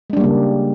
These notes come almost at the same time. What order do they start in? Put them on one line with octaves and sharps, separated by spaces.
G#3 D4 G3 A#3 C#3